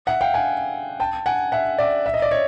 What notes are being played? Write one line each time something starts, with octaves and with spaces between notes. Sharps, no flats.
E5 F#5
F5 G5
F#5 G#5
G5 A5
F#5 G#5
E5 F#5
D5 E5
E5
D#5
D5
C#5 D#5